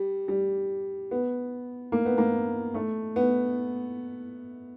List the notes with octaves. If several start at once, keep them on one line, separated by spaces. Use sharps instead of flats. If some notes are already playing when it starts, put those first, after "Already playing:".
Already playing: G3
G3
B3
A#3
B3
A#3
A3
B3